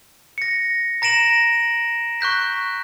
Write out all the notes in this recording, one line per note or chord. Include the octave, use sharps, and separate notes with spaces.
A#6 C#7
A#5 A#6 D7 E7 F#7
C#6 F#6 G6 B6